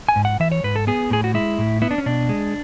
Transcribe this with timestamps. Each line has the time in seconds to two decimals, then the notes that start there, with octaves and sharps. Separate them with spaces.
0.09 G#5
0.16 G#2
0.25 F#5
0.40 E3 E5
0.52 C#5
0.64 G#2 B4
0.76 A4
0.87 B3 G#4
1.10 A2 G#4
1.24 F#4
1.34 G#3 E4
1.58 A2
1.82 B3 E4
1.91 D4
1.98 C#4
2.06 B2 D4
2.29 G#3